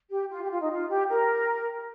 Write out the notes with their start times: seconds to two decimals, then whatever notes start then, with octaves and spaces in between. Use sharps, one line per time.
0.11 G4
0.31 F4
0.44 G4
0.50 F4
0.61 D#4
0.70 F4
0.90 G4
1.10 A#4